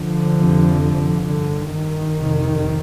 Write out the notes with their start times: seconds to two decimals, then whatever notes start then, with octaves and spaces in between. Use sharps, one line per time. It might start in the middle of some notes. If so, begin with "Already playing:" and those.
Already playing: D3 F3
0.36 F2 C3
1.24 G2 D3
1.69 D#3
2.12 F2 C3